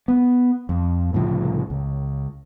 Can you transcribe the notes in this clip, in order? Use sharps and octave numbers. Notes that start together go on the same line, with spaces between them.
B3
F2
C2 A2 C#3 F3
C#2